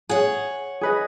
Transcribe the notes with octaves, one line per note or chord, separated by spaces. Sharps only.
G#4 C#5 F#5
G#4 B4 D#5